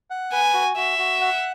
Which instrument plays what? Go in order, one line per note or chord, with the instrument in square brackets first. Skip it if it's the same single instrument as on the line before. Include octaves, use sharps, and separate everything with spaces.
[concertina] F#5
[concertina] B4 [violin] G#5
[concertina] F#4
[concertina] F#4 [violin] E5
[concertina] F#4
F#5